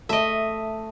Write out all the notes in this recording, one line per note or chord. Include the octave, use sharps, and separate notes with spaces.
A3 D#5 E5